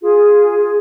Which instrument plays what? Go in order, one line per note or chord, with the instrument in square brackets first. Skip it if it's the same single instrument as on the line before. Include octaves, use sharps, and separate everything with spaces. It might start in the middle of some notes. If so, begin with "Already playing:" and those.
[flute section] F4 G#4